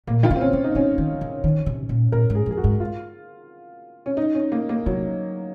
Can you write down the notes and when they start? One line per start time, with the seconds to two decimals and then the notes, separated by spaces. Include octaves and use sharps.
0.07 A#2 A#3
0.23 D#3 F4
0.30 C#3
0.36 C4
0.41 C#4
0.53 C3
0.64 D#4
0.75 C#3 C#4
0.98 D#3
1.21 C#3
1.44 D#3
1.66 C3
1.89 A#2
2.12 A#2 A#4
2.30 G#2
2.35 G#4
2.46 F2 G#4
2.57 F#4
2.64 G#2
2.80 F4
4.06 C#4
4.17 D#4
4.35 C#4
4.52 A#3
4.69 A#3
4.86 C3 F#3